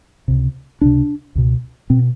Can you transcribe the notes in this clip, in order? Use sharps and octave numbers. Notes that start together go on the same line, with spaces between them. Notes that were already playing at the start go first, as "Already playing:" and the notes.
C#2 C3
C#2 C3 D4
C#2 B2
B2 C4